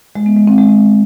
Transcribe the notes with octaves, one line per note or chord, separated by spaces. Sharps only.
G#3
B3
G#3
C4
G#3